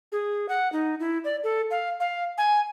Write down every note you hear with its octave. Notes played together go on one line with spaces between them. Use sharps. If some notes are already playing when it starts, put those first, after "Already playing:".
G#4
F#5
D#4
E4
D5
A4
F5
F5
G#5